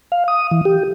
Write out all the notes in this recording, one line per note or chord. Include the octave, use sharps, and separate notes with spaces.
F5
D#6
E3
G4